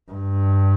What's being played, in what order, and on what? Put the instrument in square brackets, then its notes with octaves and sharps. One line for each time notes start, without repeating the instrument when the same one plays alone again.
[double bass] G2